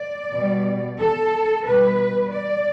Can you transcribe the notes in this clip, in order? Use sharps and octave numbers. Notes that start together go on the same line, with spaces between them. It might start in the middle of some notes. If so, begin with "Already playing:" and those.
Already playing: D5
B2 G3
A4
B2 G3 B4
D5